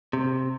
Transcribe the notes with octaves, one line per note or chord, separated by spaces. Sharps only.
C3